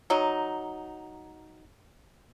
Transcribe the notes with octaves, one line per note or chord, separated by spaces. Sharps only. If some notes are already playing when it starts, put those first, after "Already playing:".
F#3 D#4